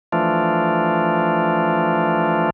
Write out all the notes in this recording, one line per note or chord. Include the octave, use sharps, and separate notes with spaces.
E3 F3 A3 D4 F4